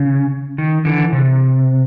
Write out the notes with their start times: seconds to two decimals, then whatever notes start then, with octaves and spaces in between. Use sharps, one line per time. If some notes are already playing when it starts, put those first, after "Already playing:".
Already playing: C#3
0.58 D#3
0.85 D3 E3
1.13 C3